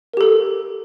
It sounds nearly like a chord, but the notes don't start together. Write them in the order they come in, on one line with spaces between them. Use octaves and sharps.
A#4 G4 A4